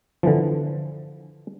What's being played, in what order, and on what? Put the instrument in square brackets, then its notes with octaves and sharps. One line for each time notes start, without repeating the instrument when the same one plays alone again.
[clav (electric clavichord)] D3 E3 F3